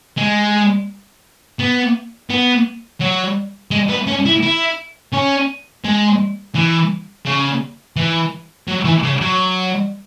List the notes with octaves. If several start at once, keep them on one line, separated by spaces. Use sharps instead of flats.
G#3
B3
B3
F#3
G#3
B3
C#4
E4
E4
C#4
G#3
E3
C#3
E3
F#3
E3
C#3
F#3